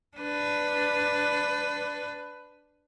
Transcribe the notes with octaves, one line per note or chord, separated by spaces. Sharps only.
D4 B4